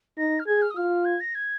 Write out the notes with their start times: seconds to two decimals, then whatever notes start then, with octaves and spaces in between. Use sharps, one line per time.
0.18 D#4 A#6
0.40 F6
0.47 G#4 G#6
0.62 F6
0.71 D#6
0.76 F4 F6
1.05 G#6
1.20 A#6
1.35 G#6